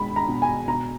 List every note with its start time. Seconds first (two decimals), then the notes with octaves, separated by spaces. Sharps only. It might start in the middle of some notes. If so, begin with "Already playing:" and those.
Already playing: B2 G#3 B5
0.16 A#5
0.29 B2
0.42 G#5
0.68 B2 A#5